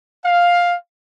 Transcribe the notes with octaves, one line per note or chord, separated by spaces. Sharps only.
F5